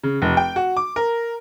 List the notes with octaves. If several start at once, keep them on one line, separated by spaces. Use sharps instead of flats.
C#3
F1
G5
F#4
D6
A#4